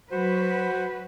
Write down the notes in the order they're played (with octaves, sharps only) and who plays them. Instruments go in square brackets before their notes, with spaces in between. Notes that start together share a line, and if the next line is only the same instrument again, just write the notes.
[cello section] F#3 B4 [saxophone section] F#4 C5